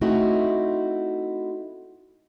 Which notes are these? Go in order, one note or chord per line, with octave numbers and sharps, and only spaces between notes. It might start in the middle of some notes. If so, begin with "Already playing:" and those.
A3 C4 D#4 E4 F#4